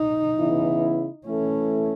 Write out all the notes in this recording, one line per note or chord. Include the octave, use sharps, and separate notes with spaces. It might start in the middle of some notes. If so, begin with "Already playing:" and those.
Already playing: D#4
C#3 E3 B3 E4
E3 A3 C#4 E4 A4